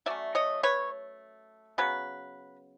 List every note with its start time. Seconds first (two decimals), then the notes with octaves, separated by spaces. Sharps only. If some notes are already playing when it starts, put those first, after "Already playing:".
0.06 F#3 A3 C#4 D5 E5
0.35 C#5 D#5
0.63 B4 C#5
1.78 C#3 F#3 B3 B4